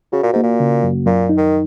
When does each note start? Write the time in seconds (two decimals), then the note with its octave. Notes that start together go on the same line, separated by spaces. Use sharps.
0.12 C#3 F#4
0.23 A#2
0.33 G#2 A#3
0.43 A#2
0.60 C#3
0.83 F#2
1.06 F#2 A#2
1.29 D#4
1.37 D#3